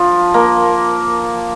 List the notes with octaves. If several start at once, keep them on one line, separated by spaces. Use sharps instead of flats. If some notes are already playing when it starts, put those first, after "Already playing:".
Already playing: F3
A#3